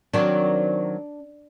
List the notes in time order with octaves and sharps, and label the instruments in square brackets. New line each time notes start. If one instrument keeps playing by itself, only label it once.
[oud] D#3 F#3 C4 [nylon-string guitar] D4